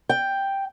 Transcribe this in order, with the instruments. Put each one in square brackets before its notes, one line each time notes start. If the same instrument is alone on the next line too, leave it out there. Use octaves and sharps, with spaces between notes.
[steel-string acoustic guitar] G5